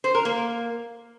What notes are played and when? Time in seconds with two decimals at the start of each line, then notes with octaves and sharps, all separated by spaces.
0.04 C5
0.15 A#4
0.25 A#3